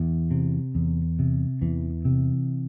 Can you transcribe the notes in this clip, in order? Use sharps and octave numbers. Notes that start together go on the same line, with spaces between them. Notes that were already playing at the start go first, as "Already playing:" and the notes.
Already playing: E2
C3
E2
C3
E2 E3
C3